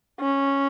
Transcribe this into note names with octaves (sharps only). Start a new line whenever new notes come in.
C#4